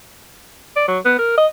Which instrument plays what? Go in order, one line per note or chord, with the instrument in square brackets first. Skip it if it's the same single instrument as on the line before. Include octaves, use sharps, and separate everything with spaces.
[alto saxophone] D5
F#3
B3
A#4
D#5